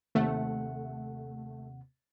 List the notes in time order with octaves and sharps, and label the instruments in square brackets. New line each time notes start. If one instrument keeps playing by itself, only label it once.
[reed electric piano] D#2 C3 F#5 [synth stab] A3